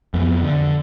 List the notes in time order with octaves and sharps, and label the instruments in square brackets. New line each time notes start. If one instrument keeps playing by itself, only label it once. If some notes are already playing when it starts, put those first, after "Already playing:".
[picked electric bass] F2 B3
D3